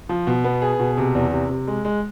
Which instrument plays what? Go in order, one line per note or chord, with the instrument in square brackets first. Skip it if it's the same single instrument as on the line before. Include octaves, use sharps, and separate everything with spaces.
[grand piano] F3
B2
B3
G#4
B2
C3
E2
C3
C3
G#3
G#3